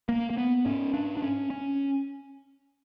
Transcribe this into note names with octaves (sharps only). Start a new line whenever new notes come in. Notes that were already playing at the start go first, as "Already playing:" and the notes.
A#3
A#3
B3
G#2 C#4
D4
D4
C#4
C#4